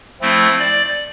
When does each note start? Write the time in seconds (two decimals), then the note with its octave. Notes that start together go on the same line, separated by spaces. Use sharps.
0.21 F3 A3 C4 E4
0.59 D5